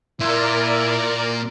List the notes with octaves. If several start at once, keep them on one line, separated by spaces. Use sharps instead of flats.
A#2 E4 F4 A#4 D5